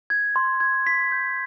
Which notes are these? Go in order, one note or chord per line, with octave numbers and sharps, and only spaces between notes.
G#6
C6
G#6
B6
G6